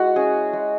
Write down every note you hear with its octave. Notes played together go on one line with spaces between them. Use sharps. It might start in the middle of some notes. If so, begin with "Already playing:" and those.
Already playing: G#3 E4 F#4
C#4 G#4
G#3